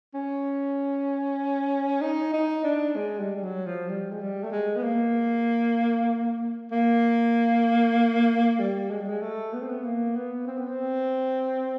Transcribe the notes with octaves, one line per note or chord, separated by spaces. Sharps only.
C#4
D#4
D#4
D4
G#3
G3
G3
F#3
F3
G3
G#3
G3
A3
G#3
B3
A#3
A#3
G3
G#3
G3
G#3
A3
B3
C4
B3
A#3
B3
C4
B3
C4